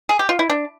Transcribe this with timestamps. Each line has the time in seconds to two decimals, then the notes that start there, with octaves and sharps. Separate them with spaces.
0.09 G#4
0.19 G4
0.29 F4
0.39 E4
0.50 D4